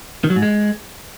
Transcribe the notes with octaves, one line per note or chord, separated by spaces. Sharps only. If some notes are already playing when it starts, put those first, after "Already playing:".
D#3
F#3
G#2
G#3